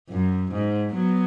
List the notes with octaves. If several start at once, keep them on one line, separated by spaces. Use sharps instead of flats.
F#2
G#2
F#3 B3